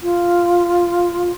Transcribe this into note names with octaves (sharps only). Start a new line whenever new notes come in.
F4